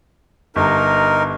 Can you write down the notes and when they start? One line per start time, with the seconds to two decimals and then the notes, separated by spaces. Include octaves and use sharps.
0.56 G1 D#4 A#4